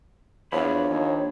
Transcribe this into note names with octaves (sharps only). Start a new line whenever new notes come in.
E2 F3 D4 C#5 B5
D#2